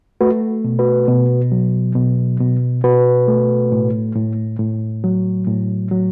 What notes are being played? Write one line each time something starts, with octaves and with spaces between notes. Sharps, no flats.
A3 F#4 B4
B2
F#4 B4
B2
F#3
B2
B2
B2 F#4 B4
A3
A2
A2
A2
F#3
A2
F#3